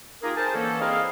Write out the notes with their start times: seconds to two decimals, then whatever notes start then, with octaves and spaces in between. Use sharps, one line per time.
0.23 A#3 D#4 F4 G4 G#4 A#4
0.36 G#4 A#4 C5 G5 A5
0.54 D3 E3 A#3 C#4 A4
0.80 C4 E4 G#4 A#4 D#5 F5